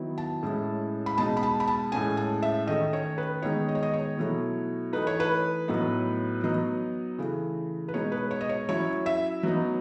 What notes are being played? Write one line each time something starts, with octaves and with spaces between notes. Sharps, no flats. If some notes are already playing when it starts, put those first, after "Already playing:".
Already playing: D#3 F#3 B3 E4
A5
A2 G#3 C#4 E4
B5
B2 G#3 D#4 A5
B5
A5
B5
A5
A2 G#3 C#4 G#5
A5
E5
D#3 A3 C#4 D#5
C#5
B4
D#3 G#3 B3 D#4 C#5
D#5
C#5
D#5
C#5
B2 F#3 A3 E4
E3 A3 D#4 B4
C#5
B4
A2 F#3 B3 D#4
F#3 B3 D#4
C#3 E3 A3
B4
B2 G#3 D#4 C#5
B4
C#5
D#5
C#5
F#3 C#4 E4 C#5
E5
F#3 B3 D#4